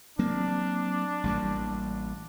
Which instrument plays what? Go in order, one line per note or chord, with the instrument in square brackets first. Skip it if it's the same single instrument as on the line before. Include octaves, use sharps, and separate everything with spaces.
[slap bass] F#3 A#3 C4 [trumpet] D4
[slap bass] A1 G3 A#3